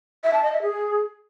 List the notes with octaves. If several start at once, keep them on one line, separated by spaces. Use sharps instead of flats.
E5
A5
D#5
E5
G#4